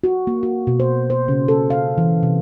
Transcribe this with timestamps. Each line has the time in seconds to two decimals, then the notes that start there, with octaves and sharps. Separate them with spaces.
0.04 F#4
0.27 A#3
0.43 F#4
0.67 B2
0.80 C5
1.10 C5
1.28 C#3
1.48 A4
1.70 F5
1.98 E3
2.23 C3